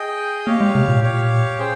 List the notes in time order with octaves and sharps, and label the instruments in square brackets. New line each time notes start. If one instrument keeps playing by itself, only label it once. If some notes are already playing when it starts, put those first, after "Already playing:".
Already playing: [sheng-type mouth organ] G#4 D#5 G5
[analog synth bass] A#3 [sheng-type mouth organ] G4 C#5 F5
[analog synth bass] G#3
C3
A#2
[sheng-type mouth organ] G4 C#5 F5
C#4 G#4 C5 G5